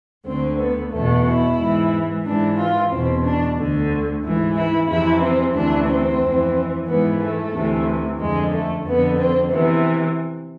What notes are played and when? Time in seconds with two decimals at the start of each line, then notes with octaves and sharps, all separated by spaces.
0.25 D2 D3 C4
0.58 B3
0.91 E2 B2 A3
1.25 E4
1.57 G#2 E3
2.23 G#2 E3 D4
2.56 F4
2.90 E2 B2 C4
3.23 D4
3.56 D2 D3
4.22 G#2 E3
4.56 E4
4.88 F2 C3 E3 E4
5.21 C4
5.55 D2 C3 E3 D4
5.87 C4
6.20 F2 E3
6.86 G#2 E3 B3
7.19 A3
7.52 D2 C3 E3
8.19 F2 D3 G#3
8.52 A3
8.85 F2 D3 B3
9.18 C4
9.51 C3 E3 B3